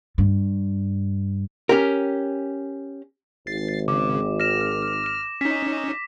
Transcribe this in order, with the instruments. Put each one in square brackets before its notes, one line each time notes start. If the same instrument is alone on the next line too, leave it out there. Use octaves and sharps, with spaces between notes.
[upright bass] G2
[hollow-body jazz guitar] C#4 G4 A#4
[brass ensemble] G#1 [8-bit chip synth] A6 C7
[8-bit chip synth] C#3 [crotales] D6
[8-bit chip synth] F6 [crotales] A#6 E7
[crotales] E7
[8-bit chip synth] C#4 D#4 [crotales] B6